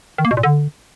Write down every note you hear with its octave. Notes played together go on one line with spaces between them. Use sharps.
D#3
A#3
B2
A#2
D3